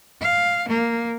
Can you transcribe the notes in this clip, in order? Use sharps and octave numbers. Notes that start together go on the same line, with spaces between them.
F5
A#3